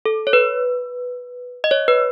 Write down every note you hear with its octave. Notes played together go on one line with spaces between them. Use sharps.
A4
C#5
B4
D#5
C#5
B4